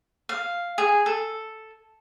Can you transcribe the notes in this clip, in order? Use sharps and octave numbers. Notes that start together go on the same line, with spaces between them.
F5
G#4
A4